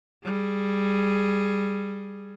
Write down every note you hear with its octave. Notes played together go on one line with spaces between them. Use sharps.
G3 G#4